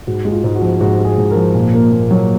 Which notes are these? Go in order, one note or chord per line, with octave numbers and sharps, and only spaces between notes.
G#2 F#4
G#3
F4
G#2
F#4
F3
G#2 F#4
G#3
G#4
G#2
A#4
F3
A#2
A#3
A#2
F#3